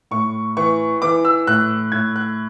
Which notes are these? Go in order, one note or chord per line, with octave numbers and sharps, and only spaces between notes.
A2 C#6
E3 C#6
E3 D6
E6
A2 F#6
A2 G#6
F#6